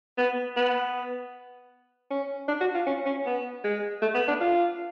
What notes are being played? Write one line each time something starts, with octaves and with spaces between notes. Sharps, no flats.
B3
B3
C#4
D4
F#4
F4
C#4
C#4
B3
G#3
A3
B3
D4
F4